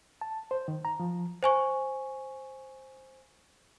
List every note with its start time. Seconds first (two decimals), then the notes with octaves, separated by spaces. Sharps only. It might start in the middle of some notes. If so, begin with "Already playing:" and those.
0.21 A5
0.51 C5
0.68 D#3
0.85 A#5
1.00 F3
1.43 C5 G#5 C#6